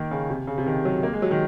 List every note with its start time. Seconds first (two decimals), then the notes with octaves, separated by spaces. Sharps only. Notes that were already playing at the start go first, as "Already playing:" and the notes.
Already playing: D#3 A#3
0.11 C#3
0.30 C3
0.47 C#3
0.58 C3
0.66 D#3
0.85 F#3
1.03 A#3
1.13 G#3
1.22 F#3
1.31 D#3